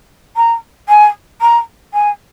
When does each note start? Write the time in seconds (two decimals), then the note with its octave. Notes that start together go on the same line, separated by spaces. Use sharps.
0.36 A#5
0.88 G#5
1.41 A#5
1.93 G#5